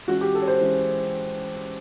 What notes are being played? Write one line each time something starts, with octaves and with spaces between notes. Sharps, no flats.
E3 G#3 C#4 F#4
G4
A4
C#5
C5
E3 G#3 C#4